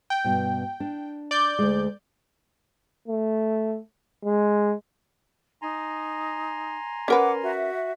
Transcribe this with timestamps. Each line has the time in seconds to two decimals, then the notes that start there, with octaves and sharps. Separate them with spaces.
0.10 G5
0.25 G2 B2
0.80 D4
1.31 D5 G6
1.59 D2 G#3
3.08 A3
4.25 G#3
5.62 D#4 G#5 A#5 C6
7.08 C#4 A#4 B4 F#5 D6
7.43 F#4 E5